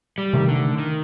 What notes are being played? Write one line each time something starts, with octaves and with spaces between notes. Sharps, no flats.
G3
C3 D#3 A3
D3
D#3